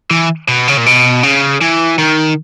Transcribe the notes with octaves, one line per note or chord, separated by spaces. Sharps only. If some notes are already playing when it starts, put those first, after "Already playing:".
E3
B2
C#3
A#2
B2
C#3
E3
D#3